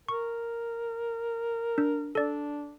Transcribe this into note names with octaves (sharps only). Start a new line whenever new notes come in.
A#4 C#6
D4
D4 A4 D5